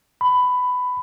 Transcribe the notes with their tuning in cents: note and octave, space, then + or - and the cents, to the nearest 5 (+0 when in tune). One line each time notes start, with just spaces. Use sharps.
B5 +15